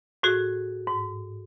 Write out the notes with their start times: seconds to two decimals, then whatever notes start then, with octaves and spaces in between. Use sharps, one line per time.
0.23 A2 F#4 G#4
0.87 G#2